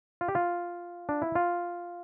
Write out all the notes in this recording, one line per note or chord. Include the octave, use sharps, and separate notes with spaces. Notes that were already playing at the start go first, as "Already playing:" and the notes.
F4
G4
F4
D4
E4
F4